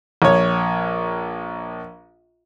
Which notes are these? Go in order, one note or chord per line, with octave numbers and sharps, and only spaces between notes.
A#1 C#5